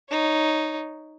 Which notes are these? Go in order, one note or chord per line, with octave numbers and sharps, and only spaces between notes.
D#4 C#5